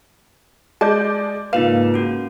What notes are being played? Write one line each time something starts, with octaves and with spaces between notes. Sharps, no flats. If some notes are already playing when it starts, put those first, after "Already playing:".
G#3 D5 A5 D6 G6
G#2 C#3 A#3 D#4 F4 B4 F5 E7
C#4 F#4